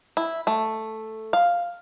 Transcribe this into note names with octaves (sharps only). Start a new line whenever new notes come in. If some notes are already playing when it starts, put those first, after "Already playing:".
E4
A3
F5